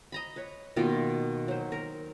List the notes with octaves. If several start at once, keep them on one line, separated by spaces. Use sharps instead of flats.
D#5 A#5 B5
B4 C#5
B2 D#3 A#3 F4
F#3 C5
A#4